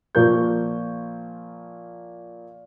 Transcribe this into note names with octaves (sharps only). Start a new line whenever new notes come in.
A#2 F3 A#4 C#6 G6